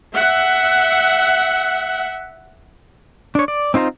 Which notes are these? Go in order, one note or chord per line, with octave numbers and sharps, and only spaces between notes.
E5 F#5
D4 C#5
D5
C4 D#4 F4 C5 A#5